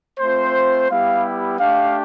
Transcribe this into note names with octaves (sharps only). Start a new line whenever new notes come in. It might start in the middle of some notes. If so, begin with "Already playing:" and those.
A3 C4 F4 C5
G3 B3 E4 G4 F5
A3 D4 G4 F5